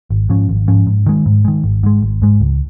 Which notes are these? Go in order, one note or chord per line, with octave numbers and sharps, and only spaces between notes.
G#1
G#2 F3 C#4
G#1
G#2 F3 C#4
G#2
D#3 G#3
G#2
D#3 G#3
G#1
G#2 G#3
G#1
G#2 G#3
C#2